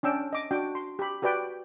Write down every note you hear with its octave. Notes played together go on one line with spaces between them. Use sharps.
C#4 D4 G5 E6
D#5 D6
D4 F#4 G5
C6
G4 B5
F#4 G4 B4 D5 G5